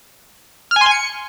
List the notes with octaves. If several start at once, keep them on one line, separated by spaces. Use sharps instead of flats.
F6
G#5
C6
G#5
C#7